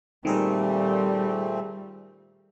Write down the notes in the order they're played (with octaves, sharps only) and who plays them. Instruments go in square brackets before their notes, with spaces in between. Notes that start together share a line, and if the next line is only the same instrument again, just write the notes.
[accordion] A#2 A3 C4 [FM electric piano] D#3 G#4 A#4 [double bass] G3